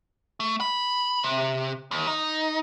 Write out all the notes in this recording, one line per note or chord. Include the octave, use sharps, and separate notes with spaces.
A3
B5
C3
D#2
D#4